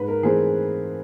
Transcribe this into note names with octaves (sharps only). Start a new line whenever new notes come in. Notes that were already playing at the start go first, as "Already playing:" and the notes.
Already playing: G#2 B4
A#4
E3 A3 C4 G#4